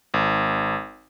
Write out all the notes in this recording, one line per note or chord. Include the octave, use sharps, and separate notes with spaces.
G#1